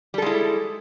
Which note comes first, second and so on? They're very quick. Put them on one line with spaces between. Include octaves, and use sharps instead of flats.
G3 A4 G#3 E4